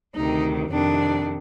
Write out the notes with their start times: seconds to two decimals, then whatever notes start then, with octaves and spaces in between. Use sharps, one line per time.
0.15 D2 C3 D#3 D#4
0.71 F2 C3 D#3 D4